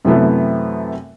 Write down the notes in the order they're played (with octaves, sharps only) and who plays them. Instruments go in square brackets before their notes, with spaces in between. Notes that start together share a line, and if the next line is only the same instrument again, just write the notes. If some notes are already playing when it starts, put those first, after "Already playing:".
[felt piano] F#2 C3 E3 A3 B3